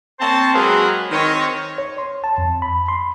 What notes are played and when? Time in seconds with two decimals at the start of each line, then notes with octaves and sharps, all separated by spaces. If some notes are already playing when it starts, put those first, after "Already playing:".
0.20 A#3 C4 C5 C#5 A5
0.54 F#3 G#3 C4 G#4 A#4 B4
1.12 D#3 C4 C#5
1.78 C#5
1.98 C6
2.24 A5
2.38 F2
2.62 B5
2.88 C6